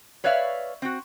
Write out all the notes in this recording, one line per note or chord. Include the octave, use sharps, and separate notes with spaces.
B4 C#5 D5 E5 F5
C4 F#4